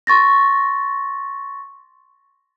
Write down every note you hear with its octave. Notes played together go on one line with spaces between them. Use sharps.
C6 C#6 A6 A#6